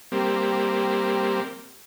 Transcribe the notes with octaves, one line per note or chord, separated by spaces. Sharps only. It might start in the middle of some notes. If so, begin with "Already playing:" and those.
G3 A#3 C4